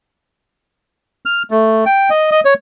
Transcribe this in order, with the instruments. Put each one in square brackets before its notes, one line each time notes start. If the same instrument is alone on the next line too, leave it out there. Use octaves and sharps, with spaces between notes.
[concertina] F6
A3
G5
D#5
D#5
C#5